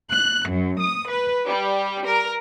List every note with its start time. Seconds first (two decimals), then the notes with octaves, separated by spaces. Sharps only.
0.12 F#6
0.49 F#2
0.80 D#6
1.10 B4
1.47 G3
2.06 A#4